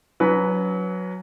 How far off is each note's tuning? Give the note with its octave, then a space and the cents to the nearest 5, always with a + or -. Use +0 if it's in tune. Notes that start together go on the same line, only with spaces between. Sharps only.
F#3 +0 C#4 +40 B4 +0